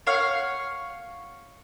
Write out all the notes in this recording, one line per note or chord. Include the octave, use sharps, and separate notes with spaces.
C#5 F5 F#5